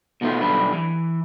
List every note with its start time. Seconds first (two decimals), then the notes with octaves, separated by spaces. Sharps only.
0.21 B2 D#3 A3 B3 F4
0.41 B1 D3 G3 B4
0.73 E3